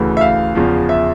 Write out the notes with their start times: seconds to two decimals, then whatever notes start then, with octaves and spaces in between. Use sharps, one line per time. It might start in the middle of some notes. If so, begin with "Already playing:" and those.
Already playing: D2 C#3 E3
0.17 E5
0.21 F5
0.55 E2 C#3 F3
0.89 E5